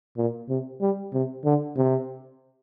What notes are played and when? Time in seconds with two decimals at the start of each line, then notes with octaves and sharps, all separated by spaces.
0.17 A#2
0.49 C3
0.81 G3
1.13 C3
1.45 D3
1.77 C3